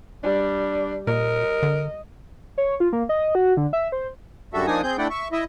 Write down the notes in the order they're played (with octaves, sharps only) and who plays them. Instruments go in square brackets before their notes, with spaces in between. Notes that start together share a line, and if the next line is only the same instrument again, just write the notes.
[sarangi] G3 [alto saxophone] D4
[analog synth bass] A#2 [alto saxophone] A#4 [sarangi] D#5
[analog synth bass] D3
[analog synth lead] C#5
F4
A#3
D#5
F#4
D3
E5
C5
[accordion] F#2 D3 G3 F#4 A4 E5
F3 A#3 D4 D#4 G#5 D#6
C4 G#4 G6
A3 D4 E4 D5 F#5 G5
E5 C#6
E4 D#5 E5